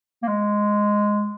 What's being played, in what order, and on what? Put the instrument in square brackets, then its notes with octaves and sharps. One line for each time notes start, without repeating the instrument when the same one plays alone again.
[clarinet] A#3
G#3